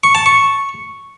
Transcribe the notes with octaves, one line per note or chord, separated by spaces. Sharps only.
C#6
A5
C#6